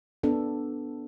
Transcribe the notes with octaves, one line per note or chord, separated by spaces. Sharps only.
B3 D4 A4